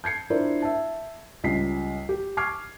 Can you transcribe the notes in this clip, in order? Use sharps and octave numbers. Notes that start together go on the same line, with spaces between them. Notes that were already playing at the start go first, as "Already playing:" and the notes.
G6 G#6 C7 C#7
D4 E4 F4 A#4 C5 D5
E5 A5
C#2 G3 B6 C7
G4
C#6 D6 F6 G#6 C7